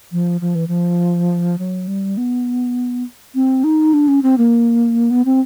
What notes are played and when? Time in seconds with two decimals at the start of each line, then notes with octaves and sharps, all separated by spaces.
0.12 F3
0.41 F3
0.55 E3
0.68 F3
1.58 F#3
1.88 G3
2.17 B3
3.35 C4
3.64 D#4
3.93 D4
4.08 C#4
4.23 C4
4.38 A#3
5.11 B3
5.25 C4